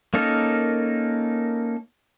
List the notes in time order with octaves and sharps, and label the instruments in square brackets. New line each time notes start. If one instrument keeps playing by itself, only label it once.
[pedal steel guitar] A#3 C#4 D#4 A4 A#4